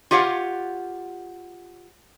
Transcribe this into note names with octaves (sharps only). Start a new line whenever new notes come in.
F4 G4 C#5 F5 F#5